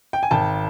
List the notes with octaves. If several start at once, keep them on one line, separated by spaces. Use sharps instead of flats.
G5
G#5
G#1 G5 A5